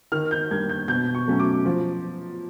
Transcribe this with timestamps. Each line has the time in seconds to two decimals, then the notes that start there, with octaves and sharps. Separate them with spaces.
0.12 D#3 F6
0.31 G6
0.51 G3 A#3 D4 G#6
0.69 G6
0.88 B2 G6
1.15 C#6
1.27 F#3 A3 C#4
1.39 D6
1.65 F3